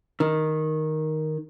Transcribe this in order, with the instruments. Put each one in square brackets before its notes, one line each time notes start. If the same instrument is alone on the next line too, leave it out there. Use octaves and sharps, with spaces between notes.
[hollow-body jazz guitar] D#3